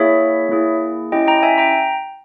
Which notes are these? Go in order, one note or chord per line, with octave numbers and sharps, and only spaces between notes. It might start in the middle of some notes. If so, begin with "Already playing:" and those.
Already playing: A#3 E4 G#4 C#5 E5
A#3 E4 G#4
C#4 E4 G4 D#5 G5
G5 A#5
E5 G#5
G5 A#5